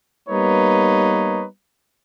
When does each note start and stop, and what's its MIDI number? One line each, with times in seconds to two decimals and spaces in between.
0.29 1.45 55
0.29 1.45 58
0.29 1.45 59
0.29 1.45 63
0.29 1.45 71
0.29 1.45 73